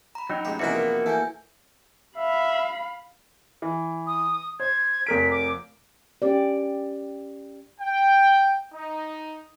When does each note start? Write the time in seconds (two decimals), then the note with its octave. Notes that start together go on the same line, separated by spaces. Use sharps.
0.15 A#5 B5
0.30 F#3 D#4 G5 E6
0.45 A1 G#3 G4
0.59 E2 C3 E3 F3 A#3 D#4 E4 F#4
0.75 A#4 B4
1.06 A3 E4 G#5 G6
2.17 E5 F5 B5
3.62 E3
4.07 D#6
4.60 C5 G#6
5.07 F1 A#4 B6 D7
5.31 D6
6.22 C#4 G4 D5
7.81 G5
8.73 D#4